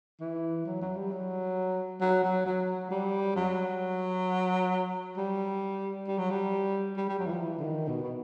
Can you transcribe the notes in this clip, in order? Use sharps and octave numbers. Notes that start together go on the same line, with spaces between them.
E3
F#3
F#3
G3
F#3
F#3
F#3
F#3
G3
F#3
G3
G3
F#3
G3
G3
G3
F#3
E3
F3
E3
D3
D#3
B2
B2